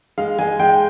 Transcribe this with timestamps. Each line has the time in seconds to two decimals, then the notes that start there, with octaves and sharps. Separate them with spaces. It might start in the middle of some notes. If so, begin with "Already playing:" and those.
0.18 G#3 F5
0.39 G#3 G#5
0.59 G#3 G5